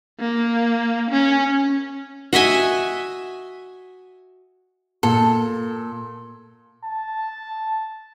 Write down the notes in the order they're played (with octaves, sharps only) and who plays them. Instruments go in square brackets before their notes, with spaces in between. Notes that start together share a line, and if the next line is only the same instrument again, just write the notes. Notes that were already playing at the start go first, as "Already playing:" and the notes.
[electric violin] A#3
C#4
[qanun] F#4 D#5 E5 G#5
[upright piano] A#2 [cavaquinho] A4
[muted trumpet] A5